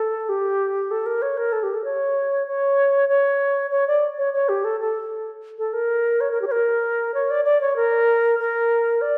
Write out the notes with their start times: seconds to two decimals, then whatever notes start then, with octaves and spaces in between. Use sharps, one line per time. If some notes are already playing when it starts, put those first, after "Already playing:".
Already playing: A4
0.29 G4
0.91 A4
1.06 A#4
1.22 C#5
1.37 A#4
1.53 A4
1.63 G4
1.74 A4
1.84 C#5
2.47 C#5
3.09 C#5
3.71 C#5
3.87 D5
4.18 C#5
4.33 C#5
4.49 G4
4.64 A4
4.80 A4
5.58 A4
5.73 A#4
6.21 C#5
6.31 A#4
6.42 G4
6.47 C#5
6.51 A#4
7.14 C#5
7.30 D5
7.45 D5
7.61 C#5
7.76 A#4
8.39 A#4
9.01 D5